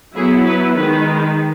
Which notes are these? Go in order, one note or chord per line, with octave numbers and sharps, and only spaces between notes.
F#3 B3 E4 G#4
B4
D#3 G#3 D#4 B4